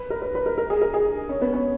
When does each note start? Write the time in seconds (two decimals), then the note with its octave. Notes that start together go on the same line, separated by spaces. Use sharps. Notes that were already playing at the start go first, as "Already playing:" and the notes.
Already playing: B4
0.10 A#4
0.22 B4
0.35 B4
0.46 A#4
0.58 A#4
0.70 G#4
0.81 A#4
0.94 G#4
1.29 C#4
1.42 B3
1.54 C#4